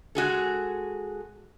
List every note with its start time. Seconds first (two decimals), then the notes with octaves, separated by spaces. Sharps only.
0.15 G#3 F#4 G#4 A4